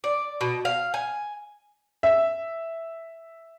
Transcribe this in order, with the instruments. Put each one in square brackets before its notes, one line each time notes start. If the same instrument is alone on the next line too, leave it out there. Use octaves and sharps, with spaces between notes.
[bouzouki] D5
B2
F5
G#5
[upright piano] E5